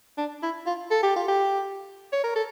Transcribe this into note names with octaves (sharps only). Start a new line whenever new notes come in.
D4
E4
F4
A4
G4
F4
G4
C#5
A#4
A4